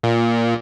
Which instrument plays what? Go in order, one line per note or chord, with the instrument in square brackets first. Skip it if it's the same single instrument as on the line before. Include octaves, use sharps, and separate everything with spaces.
[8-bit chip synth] A#2